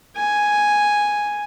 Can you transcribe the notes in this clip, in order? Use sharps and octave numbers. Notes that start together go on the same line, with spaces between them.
G#5